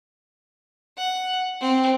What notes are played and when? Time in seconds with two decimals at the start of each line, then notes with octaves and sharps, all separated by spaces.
0.97 F#5
1.61 C4